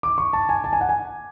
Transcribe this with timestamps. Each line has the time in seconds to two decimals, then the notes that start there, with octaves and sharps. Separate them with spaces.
0.03 D6
0.18 C#6
0.33 A5
0.49 G#5
0.64 A5
0.73 G#5
0.81 F#5
0.89 G#5